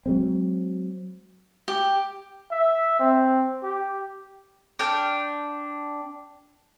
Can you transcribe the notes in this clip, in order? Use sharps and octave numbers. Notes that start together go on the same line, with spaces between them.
F#3 G#3 C4
G4
E5
C4
G4
D4 G5 F6 G6